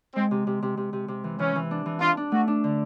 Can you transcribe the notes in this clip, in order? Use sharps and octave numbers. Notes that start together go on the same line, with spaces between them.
G#3 C4
C3
C3
C3
C3
C3
C3
E3
E3 C#4
E3
D4
E3
D4 F4
D4
A3 F#4
D4
D3